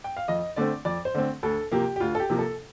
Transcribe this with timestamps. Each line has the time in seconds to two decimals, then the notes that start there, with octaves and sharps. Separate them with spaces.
0.04 G5
0.17 F5
0.28 F2 D#5
0.56 D3 A3 C4 D5
0.85 F2 D5
1.05 C5
1.14 D3 A3 C4
1.43 D2 A4
1.71 C3 F3 A#3 G4
1.96 G4
2.00 D2 F4
2.15 A4
2.20 G4
2.30 C3 F3 A#3
2.38 A4